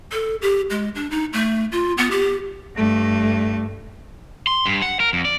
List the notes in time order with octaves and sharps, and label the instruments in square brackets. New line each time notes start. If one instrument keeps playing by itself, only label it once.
[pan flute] A4
G4
G#3
D4
D#4
A3
F4
B3
G4
[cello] G2 A3
[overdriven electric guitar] C6
G2
F#5
A#4
F2
D5